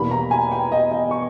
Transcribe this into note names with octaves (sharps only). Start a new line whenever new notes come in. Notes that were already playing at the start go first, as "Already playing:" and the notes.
Already playing: E2 B2 G3 A#3 B5
A#5
G#5
G5
D#5
D#5
C#6